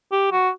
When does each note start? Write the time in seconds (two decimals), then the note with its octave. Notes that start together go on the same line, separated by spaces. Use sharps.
0.12 G4
0.32 F#4